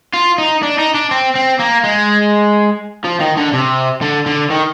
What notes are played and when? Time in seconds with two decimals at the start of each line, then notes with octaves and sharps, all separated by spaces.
0.13 F4
0.38 D#4
0.63 D4
0.78 D#4
0.95 D4
1.11 C4
1.35 C4
1.59 A#3
1.84 G#3
3.05 F3
3.21 D#3
3.37 D3
3.53 C3
4.01 D3
4.26 D3
4.50 D#3